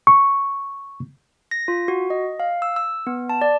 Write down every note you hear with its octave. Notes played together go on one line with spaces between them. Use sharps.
C#6
A#6
F4
F#4
D#5
F5
E6
E6
B3
A5
D5